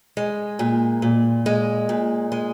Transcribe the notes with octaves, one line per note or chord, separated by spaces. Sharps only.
G#3
A#2
A#2
G#3
A#2
G#3